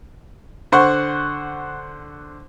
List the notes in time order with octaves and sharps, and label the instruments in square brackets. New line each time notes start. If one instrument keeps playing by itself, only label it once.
[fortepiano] D3 C5 F#5 C#6